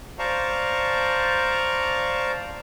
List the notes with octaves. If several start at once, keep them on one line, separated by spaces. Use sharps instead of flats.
C5 D5 F5 A5 A#5 C#6